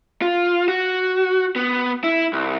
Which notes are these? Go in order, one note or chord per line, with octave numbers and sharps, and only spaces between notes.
F4
F#4
B3
E4
C2